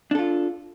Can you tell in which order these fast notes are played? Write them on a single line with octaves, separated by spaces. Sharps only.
D4 A4 F4